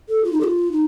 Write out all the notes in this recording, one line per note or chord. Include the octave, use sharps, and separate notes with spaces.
A4
F4
D#4
A4
F4
D#4